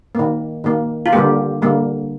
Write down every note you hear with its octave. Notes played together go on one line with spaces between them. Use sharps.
D#3 A#3
D#3 A#3
F4
D3 G3 A#3 G4
D3 G3 A#3